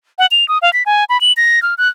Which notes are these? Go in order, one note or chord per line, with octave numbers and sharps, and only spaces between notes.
F#5
F7
D#6
F5
B6
G#5
B5
F#7
A#6
F6
F#6